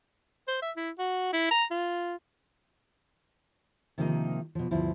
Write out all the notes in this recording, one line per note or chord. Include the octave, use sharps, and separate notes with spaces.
C5
E5
E4
F#4
E4
A#5
F4
C3 D#3 F3 A#3 B3 D#4
B2 F3
D2 G2 F3 E4